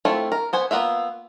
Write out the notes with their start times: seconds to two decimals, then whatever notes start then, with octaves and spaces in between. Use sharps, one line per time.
0.05 A3 C4 E4 F4
0.32 A#4
0.53 B3 C5 G#5
0.71 A#3 B3 F4 E5